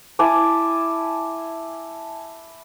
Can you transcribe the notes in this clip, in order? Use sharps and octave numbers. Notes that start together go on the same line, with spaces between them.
E4 G#5 A5 D6